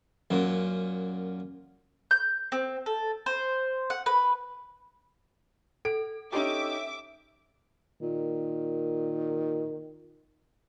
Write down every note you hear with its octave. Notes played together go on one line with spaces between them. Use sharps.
F#2 A#2
G6
C4
A4
C5
F#5
B4
A4 D7
C#4 D#4 G4 E5 D6
A#2 D#3